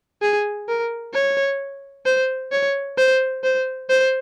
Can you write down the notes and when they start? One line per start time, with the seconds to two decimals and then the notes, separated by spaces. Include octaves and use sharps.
0.22 G#4
0.68 A#4
1.14 C#5
2.06 C5
2.52 C#5
2.98 C5
3.44 C5
3.90 C5